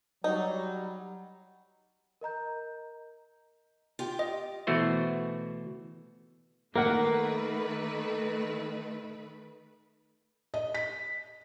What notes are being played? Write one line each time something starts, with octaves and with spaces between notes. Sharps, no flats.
F#3 G3 D#4
A#4 D#5 A#5 G6
F4 G4 G5
D#5
B2 E3 A3 F#4 C5
D#3 A3 A#3 A#4 B4 F#5
D#5
B6